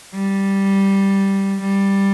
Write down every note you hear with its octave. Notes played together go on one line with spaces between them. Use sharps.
G3
G3